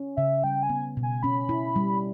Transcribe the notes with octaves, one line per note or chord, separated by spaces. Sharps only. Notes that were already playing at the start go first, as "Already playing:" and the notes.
Already playing: C#4
C#3 E5
G3 G5
G#5
B3
B2
G#5
C#4 B5
E4
G3